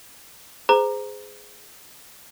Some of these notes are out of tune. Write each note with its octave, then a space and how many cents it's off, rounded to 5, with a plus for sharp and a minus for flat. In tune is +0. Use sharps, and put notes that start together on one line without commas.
G#4 +0 C5 -30 A#5 +0